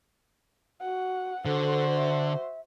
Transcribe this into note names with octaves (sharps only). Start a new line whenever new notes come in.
F#4 F#5
D3 F#4 A4 C5
E5